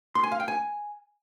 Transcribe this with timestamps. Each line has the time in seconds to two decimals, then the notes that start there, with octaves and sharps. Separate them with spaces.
0.15 C6
0.23 G#5
0.32 F5
0.40 G5
0.48 G#5